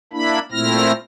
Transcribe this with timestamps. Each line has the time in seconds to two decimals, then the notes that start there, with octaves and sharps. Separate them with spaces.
0.13 A#3 D4 E4 B5
0.52 A#2 A3 C4 E4 F6 A#6